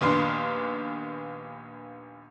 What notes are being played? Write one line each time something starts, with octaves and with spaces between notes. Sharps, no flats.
A#1 D#2 B3 D4 F5 C6